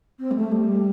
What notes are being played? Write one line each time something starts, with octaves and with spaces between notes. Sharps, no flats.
C4
G3
A3
G3